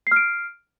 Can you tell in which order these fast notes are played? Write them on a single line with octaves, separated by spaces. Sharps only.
C7 F6 D7